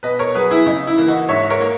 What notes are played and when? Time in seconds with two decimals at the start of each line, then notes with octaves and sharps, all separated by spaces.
0.03 B2 B4 D#5
0.19 A#4 C#5
0.35 F#3 B3 G#4 B4
0.51 E4 G#4
0.66 C#3 D#4
0.87 E4
0.98 E3 A#3
1.08 D#4 F#4
1.29 G#2 C#5 E5
1.50 A#4 C#5
1.60 A#3